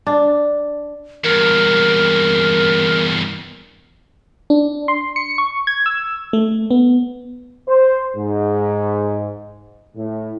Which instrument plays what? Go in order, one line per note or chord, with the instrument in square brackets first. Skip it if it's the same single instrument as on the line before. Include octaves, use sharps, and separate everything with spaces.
[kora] D4
[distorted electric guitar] E2 G2 [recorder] A#4
[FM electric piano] D4
C6
C#7
C#6
G#6
E6
A3
B3
[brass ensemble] C5
G#2
A2